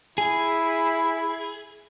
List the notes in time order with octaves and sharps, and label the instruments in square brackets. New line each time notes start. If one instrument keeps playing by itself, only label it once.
[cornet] E4 [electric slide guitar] G#4